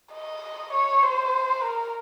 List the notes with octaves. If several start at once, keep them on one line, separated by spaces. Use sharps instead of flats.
D#5
C#5
C5
A#4